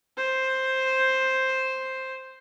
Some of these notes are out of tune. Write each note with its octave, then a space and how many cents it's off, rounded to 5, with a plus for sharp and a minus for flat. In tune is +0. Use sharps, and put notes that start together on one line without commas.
C5 +5